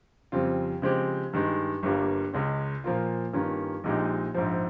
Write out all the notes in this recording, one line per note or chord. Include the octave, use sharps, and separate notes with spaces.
F2 C#3 G3 C4 F4
C#3 F3 G#3 C4 G4
G2 D#3 G#3
G1 G2 G3 A#3 F4
C#2 C#3 G#3 C#4
A#2 F3 A#3 F4
G2 D#3 A#3 C#4 F4
A#1 A#2 G#3 D#4 G4
A#1 G#2 F3